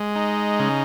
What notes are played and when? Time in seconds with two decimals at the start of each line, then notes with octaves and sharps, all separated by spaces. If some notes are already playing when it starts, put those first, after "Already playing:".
Already playing: G#3
0.16 D#4
0.60 C#3